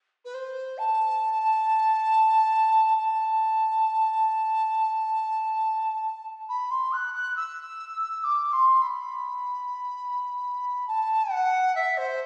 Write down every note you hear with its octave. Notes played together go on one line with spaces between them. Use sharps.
B4
C5
A5
A5
B5
C6
F#6
F#6
E6
D6
C6
B5
A5
F#5
E5
C5